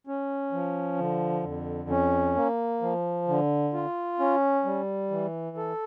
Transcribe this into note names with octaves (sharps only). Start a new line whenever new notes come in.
C#4
F3
D3
F2
C#4
A#3
F3
D3
F4
C#4
G3
E3
A4